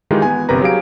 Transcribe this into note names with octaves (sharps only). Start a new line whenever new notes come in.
D#3 E3 G#3 D#4 F4 G4
B3 G#5
G1 C3 A#4 B4 A#5
F#3 G4 G#4 F5 D7